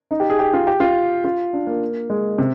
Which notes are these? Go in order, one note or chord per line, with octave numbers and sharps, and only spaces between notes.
D#4
G4
G#4
G4
F4
G4
F4
F4
D4
A#3
G#3
C3